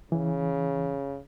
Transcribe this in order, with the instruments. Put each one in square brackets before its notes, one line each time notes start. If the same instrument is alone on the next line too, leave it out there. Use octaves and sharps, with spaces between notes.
[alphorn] C#3 [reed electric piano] E3